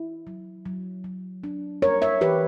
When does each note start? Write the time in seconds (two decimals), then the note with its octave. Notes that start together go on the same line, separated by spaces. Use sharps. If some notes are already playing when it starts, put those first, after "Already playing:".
Already playing: E4
0.27 F#3
0.66 F#3
1.04 F#3
1.44 D4
1.82 G3 A#4 C#5
2.02 C#5 E5
2.21 E3 G4 B4